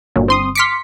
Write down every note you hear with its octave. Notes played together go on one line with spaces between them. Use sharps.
G1 A#2 F#3
C4 C6 D#6
C6 D6 F6 B6 C#7